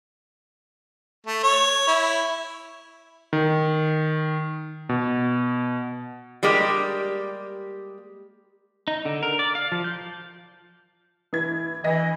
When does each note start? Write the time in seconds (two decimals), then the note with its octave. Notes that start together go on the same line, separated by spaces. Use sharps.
1.27 A3
1.43 C#5
1.88 E4
3.33 D#3
4.89 B2
6.43 G3 G#3 A#3 G4
8.88 D#4
9.05 D3
9.23 A#4
9.39 D5
9.55 F5
9.72 F3
9.84 G6
11.33 E3 G#6
11.84 E3 D#5 A#6